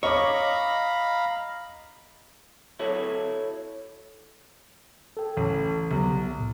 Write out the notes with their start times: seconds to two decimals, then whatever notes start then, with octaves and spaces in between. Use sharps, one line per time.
0.03 C#5 D#5 F5 A#5 B5 D6
2.79 E4 F#4 A4 C#5
5.17 A4 G5
5.37 A1
5.91 C2 F#3 B3 G4
6.36 A#1 A2